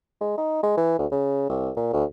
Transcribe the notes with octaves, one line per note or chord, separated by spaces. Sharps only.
G#3
D#4
G#3
E3
D2
C#3
C2
A#2
D2